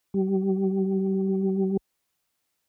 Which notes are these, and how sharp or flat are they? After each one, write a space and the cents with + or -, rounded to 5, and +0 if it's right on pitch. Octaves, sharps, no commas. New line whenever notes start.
G3 -35